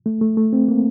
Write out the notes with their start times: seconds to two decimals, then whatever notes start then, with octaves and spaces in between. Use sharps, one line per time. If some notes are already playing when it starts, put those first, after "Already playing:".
0.06 A3
0.22 A3
0.37 A3
0.53 C4
0.68 A#3